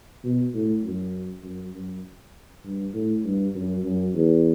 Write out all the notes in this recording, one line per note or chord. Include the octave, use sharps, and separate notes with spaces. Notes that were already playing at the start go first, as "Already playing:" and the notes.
B2
A2
F#2
F#2
F#2
G2
A2
G2
F#2
F#2
E2